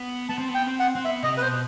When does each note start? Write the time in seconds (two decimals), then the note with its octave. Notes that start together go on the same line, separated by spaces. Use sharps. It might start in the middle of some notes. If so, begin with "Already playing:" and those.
Already playing: B3
0.29 B3 A5
0.38 C4
0.49 B3
0.54 G5
0.67 C4
0.79 F#5
0.95 C4
1.05 B3 E5
1.23 C3 D#5
1.37 B4
1.42 B2 C5